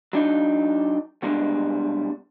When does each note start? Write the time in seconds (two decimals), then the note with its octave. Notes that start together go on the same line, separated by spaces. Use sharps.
0.13 F#3 D4 D#4
1.22 C2 B2 G3 G#3 C#4 D4